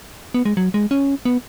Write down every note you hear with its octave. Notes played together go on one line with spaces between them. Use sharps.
B3
G#3
F#3
G#3
C#4
B3